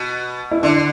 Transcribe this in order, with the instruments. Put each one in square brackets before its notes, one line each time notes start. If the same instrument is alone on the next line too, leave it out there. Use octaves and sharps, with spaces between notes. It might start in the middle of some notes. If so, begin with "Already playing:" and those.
Already playing: [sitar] B2
[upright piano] E4
[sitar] D3 [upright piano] D4